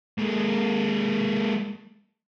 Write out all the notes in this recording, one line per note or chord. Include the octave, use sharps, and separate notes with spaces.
G#3 A#3